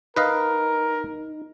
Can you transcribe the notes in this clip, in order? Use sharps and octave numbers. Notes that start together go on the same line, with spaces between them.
D#4 A#4 B4 D#5 F5